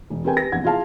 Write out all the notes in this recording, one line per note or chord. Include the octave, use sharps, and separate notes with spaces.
E1
C4 G4 A#4 B4 G5 G#5
G4 B4 A#6
A#1 E2 C3 F#5 G#6
E4 F4 G#4 F5 A5